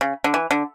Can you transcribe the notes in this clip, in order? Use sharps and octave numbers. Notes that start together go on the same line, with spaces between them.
C#3
D3
E3
D3